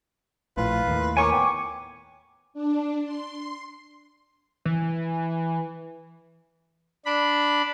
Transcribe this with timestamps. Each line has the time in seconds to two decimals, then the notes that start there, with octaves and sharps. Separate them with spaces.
0.57 A#1 A2 F4 B4
0.87 D#2 A2
1.17 A#4 C#5 G#5 C#6 D6
1.32 B3 G5
2.54 D4
3.04 C6
4.65 E3
7.06 D4 B5